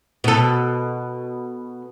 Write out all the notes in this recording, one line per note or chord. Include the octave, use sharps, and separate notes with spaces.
B2 A4